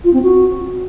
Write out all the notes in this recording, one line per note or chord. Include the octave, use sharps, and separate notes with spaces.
F4
C4
F#4